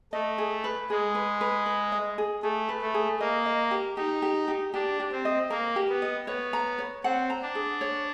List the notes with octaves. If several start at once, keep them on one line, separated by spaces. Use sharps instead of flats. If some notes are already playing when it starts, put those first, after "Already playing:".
A3 D#5
G#4
B4
G#3 G#4
B4
B4
B4
D#5
G#4
A3 G#4
B4
A3
G#4
A#3 D#5
D#5
G4
D#4 G4
G4
G4
D4 G4
G4
C4
D#5
A#3 A#4
G4
B3
D#5
B3 C#5
A#5
C#5
C4 F#5
A#5
D4
G#4
C#5